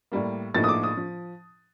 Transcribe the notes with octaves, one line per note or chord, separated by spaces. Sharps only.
A2 G3 A#3
A#1 A2 F3 A#3 D#4 A6
D#6
D6
D#6
F3